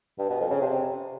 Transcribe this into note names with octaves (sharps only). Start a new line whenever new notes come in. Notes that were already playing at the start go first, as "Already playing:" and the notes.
G2
B2
F2
C#3
C3